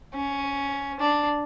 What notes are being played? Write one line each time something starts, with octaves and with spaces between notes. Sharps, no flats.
C#4
D4